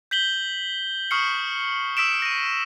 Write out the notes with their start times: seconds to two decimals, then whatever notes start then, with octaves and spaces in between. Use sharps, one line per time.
0.11 G6 B6 F#7 G7
1.11 C#6 D#6 F6 C7 C#7
1.97 D#6 E6 B6 D7 E7
2.22 A#6 D#7